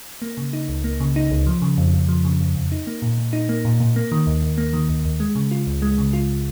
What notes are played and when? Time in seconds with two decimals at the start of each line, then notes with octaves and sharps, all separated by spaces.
0.22 A#3
0.37 C#3
0.53 D#4
0.69 C#2
0.84 A#3
1.00 C#3
1.16 D#4
1.31 C#2
1.47 F3
1.62 C#3
1.78 F2
1.94 F2
2.09 F3
2.25 C#3
2.40 F2
2.56 F2
2.72 D#4
2.87 A#3
3.02 A#2
3.18 A#2
3.33 D#4
3.49 A#3
3.65 A#2
3.80 A#2
3.96 A#3
4.12 D#3
4.27 D#2
4.42 D#2
4.58 A#3
4.73 D#3
4.89 D#2
5.05 D#2
5.20 G#3
5.35 C#3
5.51 F4
5.67 C#2
5.82 G#3
5.98 C#3
6.13 F4